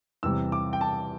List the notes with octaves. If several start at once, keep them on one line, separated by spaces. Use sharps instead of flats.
E2 C3 G3 E6
D6
G5
A5